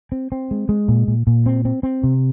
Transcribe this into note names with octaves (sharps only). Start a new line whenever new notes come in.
C4
C4
G#3
G#3
A#2
A#2
A#2
C4
C4
C4
C3